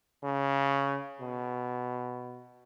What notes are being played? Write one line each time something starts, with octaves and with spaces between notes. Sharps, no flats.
C#3
B2